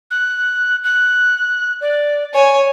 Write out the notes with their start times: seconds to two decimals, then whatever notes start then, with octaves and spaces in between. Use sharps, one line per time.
0.10 F#6
0.83 F#6
1.80 D5
2.34 C#5 G#5